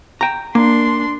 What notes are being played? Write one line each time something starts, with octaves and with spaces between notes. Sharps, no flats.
G5 A#5
A#3 D4 C6